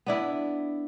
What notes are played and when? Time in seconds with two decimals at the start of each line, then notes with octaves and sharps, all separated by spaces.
0.06 B3 D4 E4